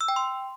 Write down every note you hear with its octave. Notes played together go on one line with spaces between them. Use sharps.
E6
G5
C6